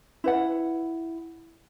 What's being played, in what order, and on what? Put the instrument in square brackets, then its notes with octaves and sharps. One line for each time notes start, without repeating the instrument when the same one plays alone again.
[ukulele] E4 B4 F#5